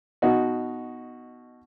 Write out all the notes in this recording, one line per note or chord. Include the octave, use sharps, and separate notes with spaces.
B2 D#4 F#4